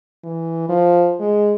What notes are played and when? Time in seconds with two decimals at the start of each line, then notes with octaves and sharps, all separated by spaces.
0.24 E3
0.69 F3
1.20 G#3